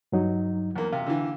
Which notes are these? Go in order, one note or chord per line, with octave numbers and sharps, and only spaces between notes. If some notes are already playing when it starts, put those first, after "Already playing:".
G2 F#3 D#4
E2 A#3
C3 F5
D3 E3